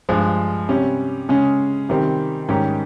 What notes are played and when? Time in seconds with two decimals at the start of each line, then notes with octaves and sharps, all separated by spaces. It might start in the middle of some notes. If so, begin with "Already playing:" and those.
0.09 G2 F3 G#3
0.69 C3 G3 C#4
1.29 C#3 G#3 C#4
1.89 C3 D#3 G3 C4
2.48 G#2 D#3 G3 C#4 G4